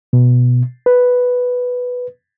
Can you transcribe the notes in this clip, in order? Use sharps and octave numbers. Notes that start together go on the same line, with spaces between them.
B2
B4